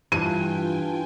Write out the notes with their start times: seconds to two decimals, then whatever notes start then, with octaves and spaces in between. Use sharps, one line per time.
0.12 G2 E3 F4 G5 G#5 D#7